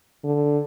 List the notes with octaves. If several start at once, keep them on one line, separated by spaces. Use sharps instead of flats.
D3